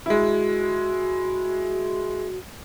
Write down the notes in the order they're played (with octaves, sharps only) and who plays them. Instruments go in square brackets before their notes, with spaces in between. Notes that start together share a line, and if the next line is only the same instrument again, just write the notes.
[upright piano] G#3 E4 [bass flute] F#4